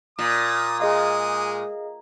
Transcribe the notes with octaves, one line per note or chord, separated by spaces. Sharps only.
A#2 D#6
G#3 G#4 D#5 F5 D#6